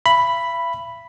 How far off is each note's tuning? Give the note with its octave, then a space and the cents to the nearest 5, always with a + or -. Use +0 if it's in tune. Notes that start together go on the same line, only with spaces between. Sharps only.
E5 +40 B5 +0